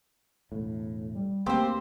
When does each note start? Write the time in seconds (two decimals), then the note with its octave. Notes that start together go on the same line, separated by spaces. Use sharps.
0.52 E1 A2
1.15 G3
1.46 D2 A#3 C4 G4 C5